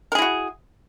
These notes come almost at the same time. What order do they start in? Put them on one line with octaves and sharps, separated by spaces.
A#4 G#4 E4 F#4